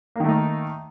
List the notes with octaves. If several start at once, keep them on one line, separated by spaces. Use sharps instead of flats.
D#3 A3 A#3 D#4